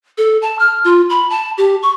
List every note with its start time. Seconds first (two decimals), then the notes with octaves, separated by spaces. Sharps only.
0.18 A4
0.42 A5
0.59 F6
0.85 F4
1.10 B5
1.30 A5
1.58 G4
1.83 C#6